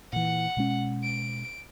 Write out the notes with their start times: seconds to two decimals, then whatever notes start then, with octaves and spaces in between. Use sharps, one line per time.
0.13 A#2 E3 F#5
0.57 B2 G#3 C#4
1.04 D7